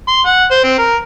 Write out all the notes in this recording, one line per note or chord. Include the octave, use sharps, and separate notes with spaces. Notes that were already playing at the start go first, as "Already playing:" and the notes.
C6
F#5
C5
C4
A#4